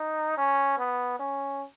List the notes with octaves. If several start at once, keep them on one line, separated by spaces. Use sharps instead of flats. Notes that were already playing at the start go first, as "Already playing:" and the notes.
Already playing: D#4
C#4
B3
C#4